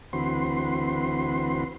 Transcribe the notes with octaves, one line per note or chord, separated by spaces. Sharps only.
D2 E3 C4 F#4 B4 C6